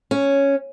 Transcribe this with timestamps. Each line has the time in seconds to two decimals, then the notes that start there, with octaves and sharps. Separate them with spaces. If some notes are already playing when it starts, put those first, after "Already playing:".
0.11 C#4